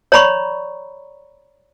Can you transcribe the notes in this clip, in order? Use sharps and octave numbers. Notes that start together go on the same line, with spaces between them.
C#5 D5 A#5 B5 C#6